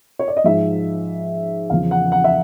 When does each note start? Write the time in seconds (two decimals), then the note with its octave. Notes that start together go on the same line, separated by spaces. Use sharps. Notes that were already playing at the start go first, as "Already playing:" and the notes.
0.19 C#5
0.28 D5
0.37 D#5
0.44 G#2 F3 E5
1.70 E2 C#3 F3 F5
1.91 F#5
2.12 F#5
2.24 E5